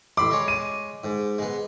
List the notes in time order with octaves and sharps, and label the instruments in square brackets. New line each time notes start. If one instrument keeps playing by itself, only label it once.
[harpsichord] A1 B5 C6 [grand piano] D6
[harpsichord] G#3 C#5
[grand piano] D#7
[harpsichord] G#2
G#3 B3